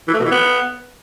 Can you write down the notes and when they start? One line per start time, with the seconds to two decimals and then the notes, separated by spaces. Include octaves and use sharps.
0.08 E3
0.14 A3
0.19 B2
0.25 E3
0.31 B3